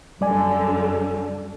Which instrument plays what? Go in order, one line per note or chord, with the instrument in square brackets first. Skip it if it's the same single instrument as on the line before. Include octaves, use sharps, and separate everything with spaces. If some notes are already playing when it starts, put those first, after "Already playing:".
[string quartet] F#2 D3 [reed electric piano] G3 D5 G#5